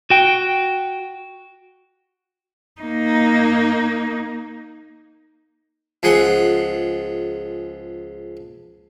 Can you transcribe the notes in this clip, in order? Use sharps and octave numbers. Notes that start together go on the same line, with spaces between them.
F#4 G5
A#3 D#4
C#2 F3 G#4 F#5 C6